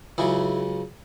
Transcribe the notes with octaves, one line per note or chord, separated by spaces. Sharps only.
C#2 C#3 F#3 E4 G#4